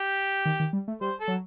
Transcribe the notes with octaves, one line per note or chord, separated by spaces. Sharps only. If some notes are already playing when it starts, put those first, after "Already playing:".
Already playing: G4
D#3
D#3
G3
A3
G3 C5
A4
F#3